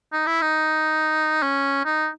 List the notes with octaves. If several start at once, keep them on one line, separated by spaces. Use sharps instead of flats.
D#4
E4
D#4
C#4
D#4